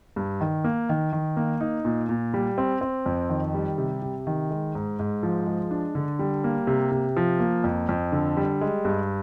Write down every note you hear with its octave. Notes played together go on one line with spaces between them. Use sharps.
G2
D#3
A#3
D#3
D#3
A#3
D#4
A#2
A#2
G3
C4
C4
F2
D#3
G3
C3
C3
D#3
G#3
G#2
G#2
F3
G#3
D4
D3
G3
A#3
C3
C3
F3
A#3
F2
F2
D3
G3
G#3
G2